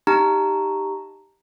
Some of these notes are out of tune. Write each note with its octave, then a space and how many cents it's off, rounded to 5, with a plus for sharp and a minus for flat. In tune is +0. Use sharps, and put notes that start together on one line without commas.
D#4 +0 G4 +0 A#5 -5